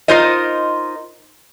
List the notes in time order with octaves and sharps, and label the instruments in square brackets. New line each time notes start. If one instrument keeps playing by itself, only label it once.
[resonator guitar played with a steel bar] D#4 F4 A#4 C5 D#5